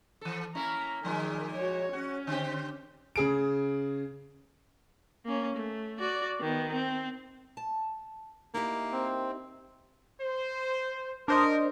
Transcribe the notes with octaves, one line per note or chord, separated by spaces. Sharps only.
E3 A4
A#3 C#4 E4 A#5
A#2 D#3 F3 G#3
F#4 C#5
C#4 F#4
D3 C4 G4
C#3 G#4 D7
A#3 C#4
A3
F#4 D5
D#3 B3
C4
A5
A#3 D#4 E4 G4
C4
C5
D4 A#4 C5 D#5